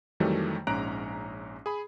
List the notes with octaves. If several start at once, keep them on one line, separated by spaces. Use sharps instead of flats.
F2 D#3 E3 F#3 G3 A3
A#1 G#2 C#4 A#5 F#6 D7
G#4 B5